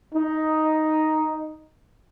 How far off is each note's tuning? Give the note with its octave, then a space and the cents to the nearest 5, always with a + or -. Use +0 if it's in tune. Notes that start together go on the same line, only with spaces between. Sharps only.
D#4 +5